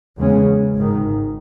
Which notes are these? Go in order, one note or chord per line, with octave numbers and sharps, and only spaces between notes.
E2 C#3 G#3 C#4
G#1 G#2 D#3